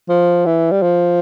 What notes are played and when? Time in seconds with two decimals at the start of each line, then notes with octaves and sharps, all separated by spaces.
0.09 F3
0.46 E3
0.71 G3
0.82 F3